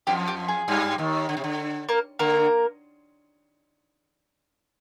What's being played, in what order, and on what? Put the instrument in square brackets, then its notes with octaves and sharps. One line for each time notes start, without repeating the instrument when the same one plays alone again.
[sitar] F2 F3 [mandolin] G4
[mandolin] G4
G#4
[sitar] G2 G3
D#2 D#3
D3
C3
D3
[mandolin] A#3 A#4
[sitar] D3 [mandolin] A#3 A#4